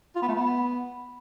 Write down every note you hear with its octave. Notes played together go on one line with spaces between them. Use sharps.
F4
B3
A3
B3